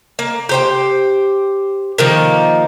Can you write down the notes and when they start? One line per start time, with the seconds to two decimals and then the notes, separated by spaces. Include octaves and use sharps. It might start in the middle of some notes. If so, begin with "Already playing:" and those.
0.19 A#3
0.49 G4 C5 G5
1.98 D#3 F3 A#3